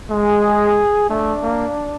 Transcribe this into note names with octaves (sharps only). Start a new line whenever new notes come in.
G#3 G#4
A3 D4
A#3